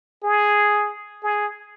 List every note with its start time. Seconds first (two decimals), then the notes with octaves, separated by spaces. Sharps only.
0.23 G#4
1.24 G#4